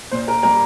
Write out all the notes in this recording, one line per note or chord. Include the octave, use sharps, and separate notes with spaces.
A#2 C5
A#4
G3 A#3 A#4